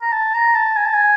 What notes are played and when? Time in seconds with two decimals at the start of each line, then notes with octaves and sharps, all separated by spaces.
0.02 A#5
0.13 A5
0.34 A#5
0.55 A5
0.77 G#5
0.86 A5
0.94 G#5